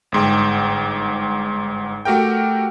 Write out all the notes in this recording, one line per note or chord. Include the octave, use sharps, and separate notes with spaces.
G1 G#2 G5
A3 F#4 G4 A#4 G5